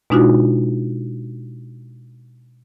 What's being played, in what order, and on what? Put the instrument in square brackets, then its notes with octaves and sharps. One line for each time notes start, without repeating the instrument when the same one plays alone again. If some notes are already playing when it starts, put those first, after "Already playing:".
[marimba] B2 G#3 D4 D#4 F4 F#4